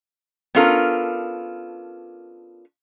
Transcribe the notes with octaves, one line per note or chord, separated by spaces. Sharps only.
B3 C#4 D4 F4 A4 A#4